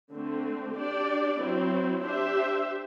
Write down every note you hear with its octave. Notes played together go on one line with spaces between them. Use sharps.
D3 A3 C4
D4 G4 D5
F#3 C4 E4
D4 G4 C5 E5